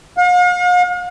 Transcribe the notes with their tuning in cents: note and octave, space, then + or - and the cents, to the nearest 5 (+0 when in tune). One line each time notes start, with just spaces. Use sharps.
F5 +45